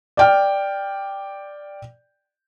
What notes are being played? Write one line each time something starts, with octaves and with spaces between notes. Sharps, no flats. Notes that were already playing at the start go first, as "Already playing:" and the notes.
D5 G5 F6